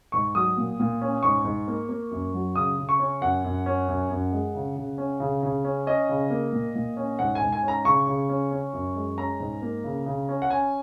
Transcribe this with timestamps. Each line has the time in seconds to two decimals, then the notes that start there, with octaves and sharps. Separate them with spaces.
0.12 G#2 C#6
0.35 F#3 D#6
0.57 A#2
0.80 A#2
1.01 C#4
1.23 G#2 C#6
1.45 G#2
1.68 A#3
1.89 A#3
2.11 F#2
2.34 F#3
2.55 C#3 D#6
2.78 C#3
2.89 C#6
2.99 C#4
3.21 F#2 F#5
3.44 F#2
3.66 C#4
3.88 F#2
4.11 F#2
4.32 G#3
4.55 C#3
4.76 C#3
4.98 C#4
5.20 C#3
5.43 C#3
5.65 C#4
5.87 C#4 D#5
6.09 C#3
6.30 A#3
6.53 A#2
6.75 A#2
6.97 C#4
7.19 G#2 F#5
7.35 G#5
7.41 G#2
7.52 G#5
7.63 C#4
7.68 A#5
7.85 C#3 C#6
8.07 C#3
8.29 C#4
8.51 C#4
8.73 F#2
8.95 G#3
9.17 C#4 A#5
9.40 G#2
9.62 A#3
9.84 C#3
10.06 C#3
10.29 C#4
10.42 F#5
10.50 C#4 G#5